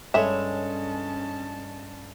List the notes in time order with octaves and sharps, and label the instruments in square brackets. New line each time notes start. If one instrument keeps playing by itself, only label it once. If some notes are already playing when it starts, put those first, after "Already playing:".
[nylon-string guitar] G2 A4 C#5 [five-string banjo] G#3 E5 [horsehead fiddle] C#4 A5